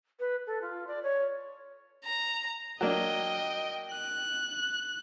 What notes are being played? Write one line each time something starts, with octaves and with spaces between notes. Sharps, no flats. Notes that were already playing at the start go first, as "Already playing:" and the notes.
B4
A4
F4
D5
C#5
A#5
F#3 A#3 D4 D#5 G5
F#6